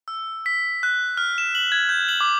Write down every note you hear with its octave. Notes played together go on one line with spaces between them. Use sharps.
E6
B6
F#6
F6
E7
F#7
G#6
G6
F#7
D6